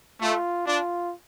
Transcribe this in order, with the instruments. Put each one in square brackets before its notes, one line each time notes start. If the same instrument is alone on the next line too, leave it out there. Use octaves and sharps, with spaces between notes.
[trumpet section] A3 [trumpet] F4
[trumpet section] D4 [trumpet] F4